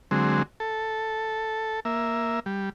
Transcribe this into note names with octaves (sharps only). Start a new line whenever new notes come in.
D3 F#3 G#3 C4
A4
A#3 E5
G3